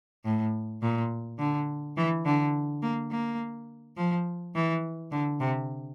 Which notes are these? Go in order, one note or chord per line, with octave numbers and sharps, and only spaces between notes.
A2
A#2
D3
E3
D3
A#3
A#3
F3
E3
D3
C3